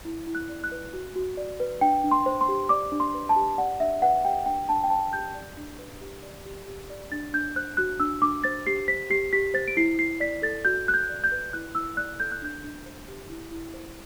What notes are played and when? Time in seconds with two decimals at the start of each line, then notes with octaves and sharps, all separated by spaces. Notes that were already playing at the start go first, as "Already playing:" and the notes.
0.05 E4
0.27 E4
0.35 F#6
0.49 D5
0.64 F#6
0.72 B4
0.93 F#4
1.16 F#4
1.37 D5
1.60 B4
1.81 D4 G5
2.04 D4
2.11 C6
2.26 C5
2.41 C6
2.48 G4
2.69 D5 D6
2.92 D4
3.00 C6
3.14 B4
3.29 A5
3.36 G4
3.58 D5 F#5
3.80 D4 E5
4.02 B4 F#5
4.25 G4 G5
4.46 D4 G5
4.69 D4 A5
4.83 G5
4.90 C5 A5
5.13 G4 G6
5.34 D5
5.57 D4
5.79 B4
6.01 G4
6.23 D5
6.45 G4
6.67 G4
6.90 D5
7.12 D4 A6
7.33 D4 G6
7.56 C5 F#6
7.77 F#4 F#6
8.00 D4 E6
8.22 D4 D6
8.44 C5 A6
8.67 G4 C7
8.88 C5 B6
9.10 G4 C7
9.33 G4 B6
9.54 C5 A6
9.68 D7
9.77 E4 C7
9.98 E4 C7
10.20 D5 B6
10.42 A4 A6
10.65 F#4 G6
10.87 F#4 F#6
10.94 G6
11.09 D5
11.24 G6
11.32 B4
11.53 E4 F#6
11.75 E4 E6
11.97 D5 F#6
12.20 A4 G6
12.32 F#6
12.42 D4 G6
12.64 D4
12.86 C5
13.08 G4
13.29 E4
13.51 E4
13.74 C5